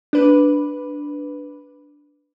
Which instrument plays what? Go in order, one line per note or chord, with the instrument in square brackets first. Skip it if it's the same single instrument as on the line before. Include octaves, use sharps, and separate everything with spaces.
[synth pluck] D4 B4